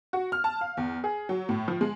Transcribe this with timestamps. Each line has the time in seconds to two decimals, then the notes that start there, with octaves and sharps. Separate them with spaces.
0.13 F#4
0.32 F6
0.44 A5
0.61 F5
0.77 E2
1.04 G#4
1.29 F#3
1.49 A2
1.68 F3
1.81 G#3